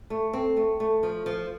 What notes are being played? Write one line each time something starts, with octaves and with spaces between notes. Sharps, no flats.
A3
C4
A3
A3
F3
F3